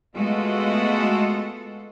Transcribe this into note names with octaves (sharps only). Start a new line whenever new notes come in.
G#3 A3 B3 F4 F#4 A4